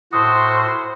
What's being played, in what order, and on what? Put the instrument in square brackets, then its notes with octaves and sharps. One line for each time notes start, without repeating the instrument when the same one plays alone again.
[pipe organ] A2 E4 [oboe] F#4 [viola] C5 [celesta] D#6